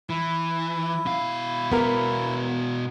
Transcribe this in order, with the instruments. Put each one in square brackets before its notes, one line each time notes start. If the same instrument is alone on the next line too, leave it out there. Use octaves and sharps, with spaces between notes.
[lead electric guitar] E3 [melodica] E4
[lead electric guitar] B2 F5
[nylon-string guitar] B3 A#4